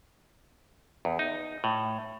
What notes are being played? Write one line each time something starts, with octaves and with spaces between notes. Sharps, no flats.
E2
D#4
A2